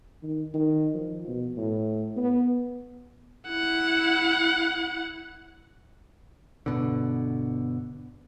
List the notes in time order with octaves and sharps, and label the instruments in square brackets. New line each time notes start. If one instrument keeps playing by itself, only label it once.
[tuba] D#3
D#3
F3
B2
A2
B3
[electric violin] E4 F#5
[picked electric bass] G1 B2 D3